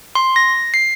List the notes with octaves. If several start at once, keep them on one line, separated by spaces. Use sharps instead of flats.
C6
A#6
C7